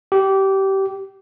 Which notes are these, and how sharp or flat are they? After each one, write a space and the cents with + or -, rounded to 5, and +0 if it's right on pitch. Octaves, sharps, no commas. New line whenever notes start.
G4 -20